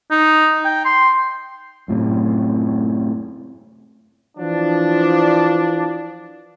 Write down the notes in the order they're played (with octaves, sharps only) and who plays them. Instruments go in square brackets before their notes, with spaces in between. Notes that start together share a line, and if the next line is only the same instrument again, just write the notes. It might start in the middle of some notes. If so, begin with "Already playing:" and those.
[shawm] D#4
G5
C6
[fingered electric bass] F#2 A2 C3
[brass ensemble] E3 F3 D4